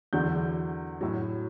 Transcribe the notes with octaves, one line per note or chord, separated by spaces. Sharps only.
E2 D3 F#3 G6
A2 F#3